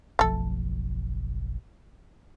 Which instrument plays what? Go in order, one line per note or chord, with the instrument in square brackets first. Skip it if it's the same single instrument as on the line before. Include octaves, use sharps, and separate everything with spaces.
[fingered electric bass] F#1 B1 F3 [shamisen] A3 A4